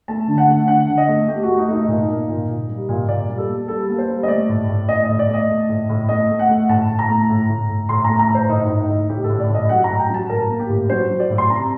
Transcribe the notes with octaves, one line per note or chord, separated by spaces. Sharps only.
A3 A5
D3
F#5
A3
D3 F#5
D3
D#5
A3
A3 G4
A3 F#4
D#4
A3 D#4
A#2 D#4
A#3
A#2
A#2
G3
A#2
A#2 D5
G3
A4
A#3
G3 A4
A#3
C5
G3
D#5
A3 D5
A2
A2
A3 D#5
D#5
A2
D5
A3
D#5
A3
A2
A2
A3 D#5
A3
F#5
A3
A2 A5
A2
A#5
A3
A2
A2
A2
A2 C6
A3 A#5
A#5
A2
C5
A2 D#4
D#4
A2
D#4
A2
A2 G4
A4
A2
D5
A2 D#5
F#3 F#5
A#5
A2
G5
F#3 A5
A2 A#4
A#3
G4
A2
F#3 C5
F#3
D5
A2
C6
C3 A#5